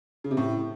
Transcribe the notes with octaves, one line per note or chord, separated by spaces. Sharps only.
C#3
C3
A2